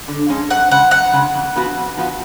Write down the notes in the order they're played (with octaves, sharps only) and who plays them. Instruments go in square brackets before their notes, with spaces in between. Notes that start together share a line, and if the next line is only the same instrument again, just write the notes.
[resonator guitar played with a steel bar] D3
F3 G#3 C#4 G#4
[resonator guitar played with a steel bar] F#2 [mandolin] F#5
[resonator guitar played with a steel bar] C#3 G#3 [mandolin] F#5
[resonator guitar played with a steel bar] F#2 [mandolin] F#5
[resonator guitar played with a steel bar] C#3 G#3
F2
F3 B3 F#4
F2
F3 B3 F#4